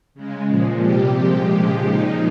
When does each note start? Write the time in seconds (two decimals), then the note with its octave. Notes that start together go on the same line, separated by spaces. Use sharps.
0.14 C#3 G#3
0.48 A#2 F3 G#3
0.82 C3 G3 G4
1.16 A#2 F3 G#3 G4
1.50 C#3 F3 G#3 G4
1.84 A#2 F3 G#3 D#4